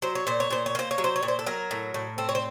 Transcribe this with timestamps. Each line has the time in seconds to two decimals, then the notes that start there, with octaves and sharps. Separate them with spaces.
0.02 F#3 C5
0.15 C#5
0.27 A#2 C5
0.40 C#5
0.50 A#2 C5
0.66 C#5
0.75 A#3 C5
0.91 C#5
0.98 F#3
1.04 C5
1.16 C#5
1.23 A#2
1.28 C5
1.39 A4
1.47 F#3 A#4
1.71 A2
1.94 A2
2.18 C4 A4
2.29 C#5
2.35 C5